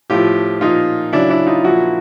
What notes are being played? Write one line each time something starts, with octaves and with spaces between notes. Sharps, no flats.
A2 F3 F4 G4
A#2 F3 D#4 F4
C#3 F#3 D4 E4
D4 E4
D#4 F4
A#2 F3 E4 F#4